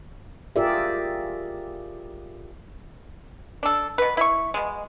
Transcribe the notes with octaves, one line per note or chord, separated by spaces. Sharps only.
F4 G4 G#4 A#4 D5 E5
D4 A4
B2 B4
E4 E5 C#6
B2 G#3